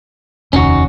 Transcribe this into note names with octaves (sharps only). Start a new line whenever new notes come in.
F1 D#2 C#4 D#4 F#4